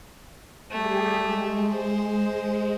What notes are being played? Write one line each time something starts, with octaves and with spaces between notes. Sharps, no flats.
G3 A3 G4 G#4
G#3
C5